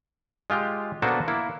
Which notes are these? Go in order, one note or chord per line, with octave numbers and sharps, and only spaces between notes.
G#3 F4 G4
A#3 B3 D4 F#4 A4 C5
A#3 E4